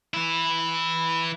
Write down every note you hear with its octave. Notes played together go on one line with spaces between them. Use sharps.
E3 E4